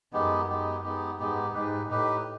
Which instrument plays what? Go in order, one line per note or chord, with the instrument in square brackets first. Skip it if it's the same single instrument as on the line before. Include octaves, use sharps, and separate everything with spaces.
[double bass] F#2 [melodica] G#3 B3 D#4 G4
[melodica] G#3 B3 D#4 G4
G#3 B3 D#4 G4
[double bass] G#2 [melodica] G#3 B3 D#4 G4
[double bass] G#2 [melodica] D#4 G4 B4
[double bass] A2 [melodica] D#4 G4 B4